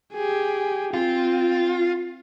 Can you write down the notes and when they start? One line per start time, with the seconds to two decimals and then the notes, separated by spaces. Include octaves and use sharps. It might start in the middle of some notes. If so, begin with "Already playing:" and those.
0.14 G4 G#4
0.94 C4 F4